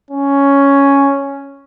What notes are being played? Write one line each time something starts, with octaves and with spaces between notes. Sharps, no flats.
C#4